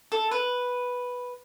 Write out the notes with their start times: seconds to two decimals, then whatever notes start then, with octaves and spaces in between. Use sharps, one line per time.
0.12 A4
0.31 B4